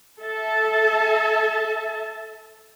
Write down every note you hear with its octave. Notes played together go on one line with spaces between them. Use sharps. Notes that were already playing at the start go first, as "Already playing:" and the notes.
A4 E5 A5